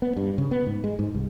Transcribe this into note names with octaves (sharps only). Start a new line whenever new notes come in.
B3
G2
C#3
B3
G#2
G#3
G#2
C2